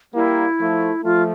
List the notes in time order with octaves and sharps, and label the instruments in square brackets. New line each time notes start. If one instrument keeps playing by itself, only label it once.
[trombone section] G3 A#3 [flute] E4
[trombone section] F3 A3
[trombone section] F3 A3 [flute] F4